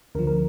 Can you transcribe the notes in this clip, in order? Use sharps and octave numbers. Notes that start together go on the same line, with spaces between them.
D2 D3 F3 A#4
A#4